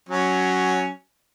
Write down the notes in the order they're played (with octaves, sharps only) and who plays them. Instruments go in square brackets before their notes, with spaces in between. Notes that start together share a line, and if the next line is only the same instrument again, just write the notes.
[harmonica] F#3 C#4